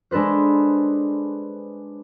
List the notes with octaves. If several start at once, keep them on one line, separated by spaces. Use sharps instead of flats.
G#3 D4 A4 B4 C5